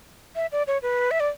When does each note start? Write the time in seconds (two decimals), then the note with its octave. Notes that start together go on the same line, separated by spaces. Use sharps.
0.36 E5
0.52 D5
0.67 C#5
0.82 B4
1.11 E5
1.20 D5